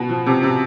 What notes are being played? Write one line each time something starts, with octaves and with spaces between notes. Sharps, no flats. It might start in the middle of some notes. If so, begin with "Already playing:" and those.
Already playing: B2
F3
C3
C3